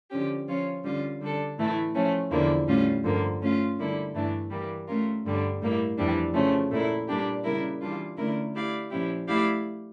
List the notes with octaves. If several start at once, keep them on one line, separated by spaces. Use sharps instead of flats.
D3 F3 C#4 G4
F3 C#4 F4 C#5
D3 G3 C#4 F4
D3 G3 D4 A4
A2 E3 A3 E4
F3 A3 C#4
E2 D3 F3 A#3 E4
A2 G3 C#4 F4
G2 D3 F3 A#3
A3 C#4 F4
D3 G3 A#3 E4 A4
G2 E3 A3 D4
E3 G3 A#3
A3 C#4 F4 A#4
G2 D3 G3 D4
A2 G3 A#3 E4
F2 E3 G3 D4
C#3 F3 A3 C#4
A#2 A3 E4 A#4
A#2 G3 A#3 D4 G4
C#3 G3 A#3 E4 A#4
E3 G3 D4 F4
D3 A3 C#4 E4 A#4
A3 E4 G4 D5 F5
A#2 F3 C#4 E4 G4
A3 E4 G4 D5 F5